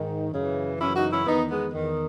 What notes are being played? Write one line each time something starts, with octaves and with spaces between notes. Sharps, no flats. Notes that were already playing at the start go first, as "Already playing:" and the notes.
Already playing: G#2 D#3
F#2 C#3 E3
F#2 C#3 E3 C#4 E4
D#4 F#4
C#4 E4
E2 D#3 B3 D#4
G#3 B3
E2 D#3